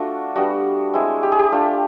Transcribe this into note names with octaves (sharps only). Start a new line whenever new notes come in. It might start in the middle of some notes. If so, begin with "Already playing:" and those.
Already playing: A3 D4 F4 F#4
G3 B3 D4 F#4
G#3 C4 E4
G4
G#4
G4
A3 D4 F4